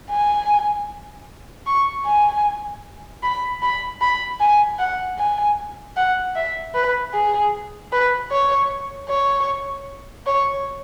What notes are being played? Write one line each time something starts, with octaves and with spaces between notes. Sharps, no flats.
G#5
C#6
G#5
B5
B5
B5
G#5
F#5
G#5
F#5
E5
B4
G#4
B4
C#5
C#5
C#5